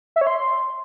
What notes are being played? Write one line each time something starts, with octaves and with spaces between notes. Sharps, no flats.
E5
C#5
C6